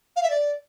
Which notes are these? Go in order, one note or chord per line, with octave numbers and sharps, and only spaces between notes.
F5
E5
D5